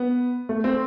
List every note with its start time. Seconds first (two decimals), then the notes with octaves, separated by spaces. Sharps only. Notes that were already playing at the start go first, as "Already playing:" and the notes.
Already playing: B3
0.49 A3
0.64 C4